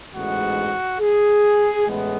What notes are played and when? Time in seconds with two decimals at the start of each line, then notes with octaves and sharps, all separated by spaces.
0.12 A1 G#2 G#3 B3 F#4
1.00 G#4
1.87 A1 A2 G#3 B3